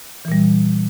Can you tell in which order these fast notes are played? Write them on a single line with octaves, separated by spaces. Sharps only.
E3 A#2 G3